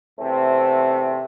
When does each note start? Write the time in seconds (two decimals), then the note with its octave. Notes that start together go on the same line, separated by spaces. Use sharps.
0.19 E2 C3 A3 C4